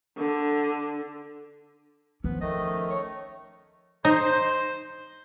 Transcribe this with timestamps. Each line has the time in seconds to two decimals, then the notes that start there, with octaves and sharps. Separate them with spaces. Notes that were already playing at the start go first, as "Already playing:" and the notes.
0.17 D3
2.24 F3 B3 C#4
2.41 D#3 A3 D#5
2.90 C#5
4.05 D#4 C5